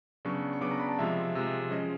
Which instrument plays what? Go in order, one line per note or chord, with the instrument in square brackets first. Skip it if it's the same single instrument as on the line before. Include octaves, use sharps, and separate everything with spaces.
[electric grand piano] C#3 F#3 B3 D4 C#6
C#6
C#3 F#3 B3 D4 D6
A#5
B5
A5
C3 F3 G#3 E5
C3 F3 G#3
F3 G#3 C#4 D#5